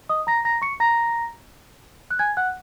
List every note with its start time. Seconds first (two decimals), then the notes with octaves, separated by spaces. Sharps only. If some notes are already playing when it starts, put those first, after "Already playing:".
0.09 D#5 D#6
0.27 A#5 A#6
0.45 A#5 A#6
0.62 C#6 C#7
0.80 A#5 A#6
2.11 F#6
2.19 G#5 G#6
2.37 F#5 F#6